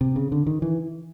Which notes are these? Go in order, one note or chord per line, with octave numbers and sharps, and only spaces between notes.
C3
C#3
D3
D#3
E3